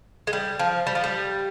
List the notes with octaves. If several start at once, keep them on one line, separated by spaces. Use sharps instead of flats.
G#3
G3
F3
G3
F3
G3